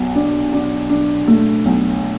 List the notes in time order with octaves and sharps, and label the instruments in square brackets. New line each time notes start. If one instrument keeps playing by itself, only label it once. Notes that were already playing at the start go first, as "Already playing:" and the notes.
Already playing: [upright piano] B1 B2
D4
D4
D4
A3
B1